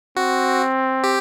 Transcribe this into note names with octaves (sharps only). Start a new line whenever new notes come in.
C4 F#4
G4